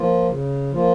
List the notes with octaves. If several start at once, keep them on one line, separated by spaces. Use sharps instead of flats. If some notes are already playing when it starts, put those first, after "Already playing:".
Already playing: F3 A#3 F4
C#3
F3 A#3 F4